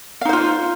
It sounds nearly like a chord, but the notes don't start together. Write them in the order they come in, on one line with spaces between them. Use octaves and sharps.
F5 D#4 C5 F4